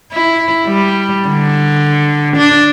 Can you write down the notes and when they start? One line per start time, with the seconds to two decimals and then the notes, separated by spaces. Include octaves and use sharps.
0.13 E4
0.67 G3
1.28 D3
2.37 D4